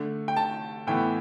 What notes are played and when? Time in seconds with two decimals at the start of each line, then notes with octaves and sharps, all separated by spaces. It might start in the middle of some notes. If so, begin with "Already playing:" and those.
Already playing: D3 A3
0.28 G5
0.36 A5
0.87 A2 E3 B3 G5